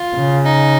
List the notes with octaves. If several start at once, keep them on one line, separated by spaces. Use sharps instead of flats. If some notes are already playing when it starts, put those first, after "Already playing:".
Already playing: F4
C#3
D#4